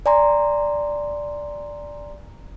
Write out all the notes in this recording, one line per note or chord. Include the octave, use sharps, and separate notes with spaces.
D5 G#5 A#5 C6